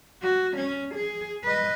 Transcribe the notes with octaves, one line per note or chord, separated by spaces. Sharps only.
F#4
C#4
G#4
B4 D#5